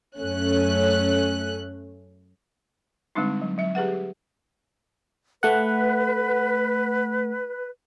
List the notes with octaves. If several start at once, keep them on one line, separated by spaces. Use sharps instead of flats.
F#2 A3 C#4 F#6
D3 G3 G#3 C4 D4 D#4
F#3
F#3 E5
G4 G#4 B4 F#5
A3 B4 F#5